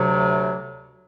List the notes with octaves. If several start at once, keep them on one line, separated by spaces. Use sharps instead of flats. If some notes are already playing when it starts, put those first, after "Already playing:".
Already playing: D2 C3 F#3